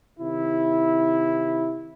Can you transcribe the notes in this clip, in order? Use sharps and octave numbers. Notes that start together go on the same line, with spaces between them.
C3 D#3 E4